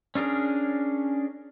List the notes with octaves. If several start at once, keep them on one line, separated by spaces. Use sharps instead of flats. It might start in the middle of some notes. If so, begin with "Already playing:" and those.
C#4 D4 G#4 A#4